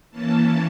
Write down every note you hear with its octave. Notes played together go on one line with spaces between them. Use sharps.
E3 A#3 C#4 A5